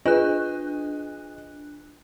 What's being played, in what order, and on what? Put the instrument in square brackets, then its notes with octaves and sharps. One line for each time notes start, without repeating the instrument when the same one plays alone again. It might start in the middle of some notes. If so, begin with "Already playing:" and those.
[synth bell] D4 F#6 [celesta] F4 B4 [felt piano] G#4 D#5